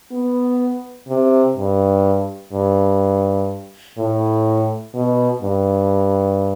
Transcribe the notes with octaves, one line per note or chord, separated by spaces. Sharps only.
B3
C3
G2
G2
A2
B2
G2